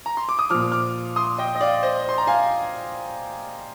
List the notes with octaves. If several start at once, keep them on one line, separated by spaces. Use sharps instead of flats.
A#5
C6
D6
D#6
A#2 F3 D6 F6
D6 F6
C6 D#6
D#5 G5
D#5
D5 F5
C5 D#5
C6
A#5
F5 G#5